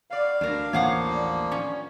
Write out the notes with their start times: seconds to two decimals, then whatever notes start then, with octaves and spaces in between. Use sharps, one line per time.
0.10 B2 D5 F5
0.41 D2 D4 A#4
0.73 A1 D#2 D3 F3 A#3 C#5 F5 F#5
1.09 G3 D4
1.52 C#4